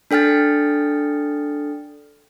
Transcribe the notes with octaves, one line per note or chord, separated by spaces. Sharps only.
D4 A4 G5 F6 A6